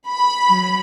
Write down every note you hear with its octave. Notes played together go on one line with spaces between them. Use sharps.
B5
F#3